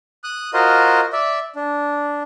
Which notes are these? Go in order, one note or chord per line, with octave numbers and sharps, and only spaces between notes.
D#6 F#6
F4 F#4 A#4 C5 D#5
D5 E5
D4